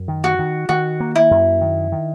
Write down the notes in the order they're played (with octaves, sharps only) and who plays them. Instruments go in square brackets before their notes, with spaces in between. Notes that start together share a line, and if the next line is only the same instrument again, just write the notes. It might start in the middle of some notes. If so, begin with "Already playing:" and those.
Already playing: [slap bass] F#2
D#3
[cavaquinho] F#4
[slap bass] D#3
[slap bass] D#3 [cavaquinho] F#4
[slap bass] A#3
[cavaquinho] E4
[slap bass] F#2
D#3
D#3